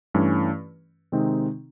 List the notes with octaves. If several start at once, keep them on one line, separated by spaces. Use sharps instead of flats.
G2 E3 A3 C#4
C3 D#3 G#3 C4 D#4